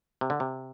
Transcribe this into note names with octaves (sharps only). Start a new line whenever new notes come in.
C3
D3
C3